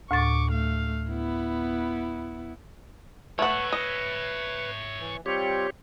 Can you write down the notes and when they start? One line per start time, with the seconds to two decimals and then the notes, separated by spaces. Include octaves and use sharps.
0.11 D2 A2 C#6 D6 A6
0.51 A3 F5
1.10 B3 E4
3.39 A3 B4 C#5 E5 F#5
3.72 D#5
5.00 E3
5.26 G3 C4 F4 G4 C#5